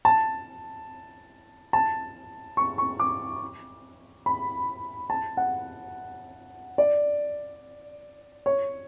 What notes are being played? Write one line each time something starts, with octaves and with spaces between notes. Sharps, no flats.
A5
A5
C#6
C#6
D6
B5
A5
F#5
D5
C#5